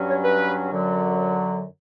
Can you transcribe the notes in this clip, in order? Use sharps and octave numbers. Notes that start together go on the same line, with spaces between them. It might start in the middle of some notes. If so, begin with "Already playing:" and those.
Already playing: G2 F#3 C#4
C#5
B4
F#2 D3 F#3